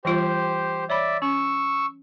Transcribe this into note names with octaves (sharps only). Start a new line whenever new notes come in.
E3 G3 F4 G4 C5
C#5 D5 E5 B5
C#4 C#6 E6